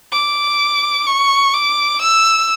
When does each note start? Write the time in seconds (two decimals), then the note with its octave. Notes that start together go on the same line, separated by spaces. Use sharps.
0.12 D6
1.07 C#6
1.54 D6
2.02 E6